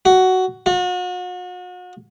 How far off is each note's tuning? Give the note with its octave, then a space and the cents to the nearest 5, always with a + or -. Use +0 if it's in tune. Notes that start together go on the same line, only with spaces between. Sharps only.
F#4 +10
F#4 -40